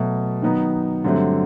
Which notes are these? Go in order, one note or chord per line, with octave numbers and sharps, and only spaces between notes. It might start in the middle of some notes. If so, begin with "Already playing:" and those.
Already playing: B2 F#3 A3
D#3 F#3 B3 D#4
G2 D3 F#3 A3 C4